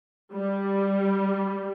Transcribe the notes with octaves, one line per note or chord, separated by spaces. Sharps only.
G3